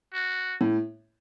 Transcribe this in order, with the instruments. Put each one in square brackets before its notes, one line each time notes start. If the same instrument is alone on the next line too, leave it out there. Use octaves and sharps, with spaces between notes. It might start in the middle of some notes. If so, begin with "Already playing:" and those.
[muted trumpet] F#4
[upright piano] A2